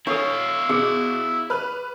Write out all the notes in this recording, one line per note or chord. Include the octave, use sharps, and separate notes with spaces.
D4 E4 A4 C#5 F5
B2 G#4 D6
B4 F6 F#6